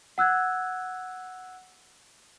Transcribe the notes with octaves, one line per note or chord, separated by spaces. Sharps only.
F#5 E6 F#6 G#6